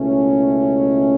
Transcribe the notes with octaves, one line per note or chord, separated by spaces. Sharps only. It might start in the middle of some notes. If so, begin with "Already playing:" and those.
Already playing: C#2 B2 A3 C#4 E4